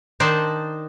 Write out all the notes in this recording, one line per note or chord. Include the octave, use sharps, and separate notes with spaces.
D#3 D4 D#4 C5 D5 A5